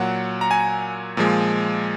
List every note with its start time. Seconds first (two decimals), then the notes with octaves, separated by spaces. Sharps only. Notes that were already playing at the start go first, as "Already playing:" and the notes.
Already playing: A#2 F#3 F#5
0.41 A#5
0.51 G#5
1.17 A#2 F3 G#3